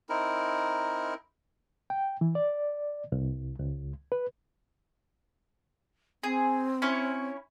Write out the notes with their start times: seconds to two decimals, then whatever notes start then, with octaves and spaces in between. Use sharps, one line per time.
0.09 C4 D#4 E4 A#4
1.90 G5
2.21 E3
2.35 D5
3.12 C2
3.59 C#2
4.12 B4
6.23 C4 G#4
6.82 C#4 E4 C#5